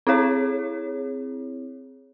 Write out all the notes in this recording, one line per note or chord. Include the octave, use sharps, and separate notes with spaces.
C4 E4 G#4 C#5